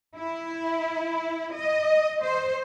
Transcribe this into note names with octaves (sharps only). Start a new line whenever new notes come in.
E4
D#5
C5